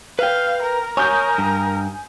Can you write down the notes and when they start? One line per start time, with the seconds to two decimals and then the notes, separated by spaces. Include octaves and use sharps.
0.19 B4 F5 G5
0.62 A#4
0.97 A#4 C#5 G#5 D#6 G6
1.38 G2